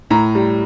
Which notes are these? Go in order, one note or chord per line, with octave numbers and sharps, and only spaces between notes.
A2 A#5
G3